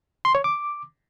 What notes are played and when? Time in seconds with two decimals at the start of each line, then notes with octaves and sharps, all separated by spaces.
0.25 C6
0.35 C#5
0.44 D6